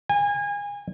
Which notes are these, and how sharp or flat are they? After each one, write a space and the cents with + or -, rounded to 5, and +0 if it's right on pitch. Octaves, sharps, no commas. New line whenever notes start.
G#5 -30